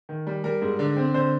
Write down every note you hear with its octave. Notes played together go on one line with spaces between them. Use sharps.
D#3
G3
G3 A#4
G#2
D3
C4
D3 C5